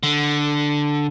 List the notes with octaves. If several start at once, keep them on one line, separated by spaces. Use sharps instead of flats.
D3